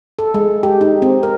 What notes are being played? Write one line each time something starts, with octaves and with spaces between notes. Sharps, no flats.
A4
G#3
G4
D#4
C4
A#4